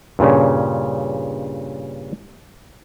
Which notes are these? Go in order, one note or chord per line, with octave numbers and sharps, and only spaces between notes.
G2 A#2 C#3 C#4